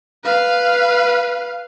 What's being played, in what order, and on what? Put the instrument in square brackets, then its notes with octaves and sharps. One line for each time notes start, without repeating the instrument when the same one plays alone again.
[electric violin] B4 F5